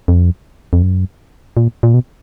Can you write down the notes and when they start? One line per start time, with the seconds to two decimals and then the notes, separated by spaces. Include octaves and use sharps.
0.08 F2
0.73 F2
0.83 F#2
1.57 A#2
1.83 A#2
1.94 B2